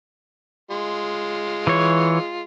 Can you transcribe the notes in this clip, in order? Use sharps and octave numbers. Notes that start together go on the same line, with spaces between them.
G#3 F4
E3 C#5